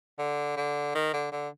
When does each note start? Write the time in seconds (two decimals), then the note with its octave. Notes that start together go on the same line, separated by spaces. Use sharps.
0.18 D3
0.56 D3
0.95 D#3
1.13 D3
1.31 D3